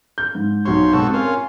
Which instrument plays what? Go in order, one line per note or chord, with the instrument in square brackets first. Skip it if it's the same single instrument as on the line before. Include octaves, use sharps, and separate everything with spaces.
[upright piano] G6
G#2
[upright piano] B1 F#4 G6 [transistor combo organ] C5 C#5
[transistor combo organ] B2 F#4 A4 [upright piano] G#3 C4
[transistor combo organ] C#4 F4 [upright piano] A#4
[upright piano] G#5